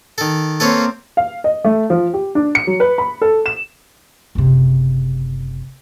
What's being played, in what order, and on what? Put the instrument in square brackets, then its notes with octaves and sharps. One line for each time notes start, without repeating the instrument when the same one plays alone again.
[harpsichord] D#3 A4
[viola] A#3 C4 [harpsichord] A4 B4 C#5
[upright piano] F5
D#5
A3
F3
G4
D4
C#7
F#3
B4
B5
A4
E7
[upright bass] F#1 C3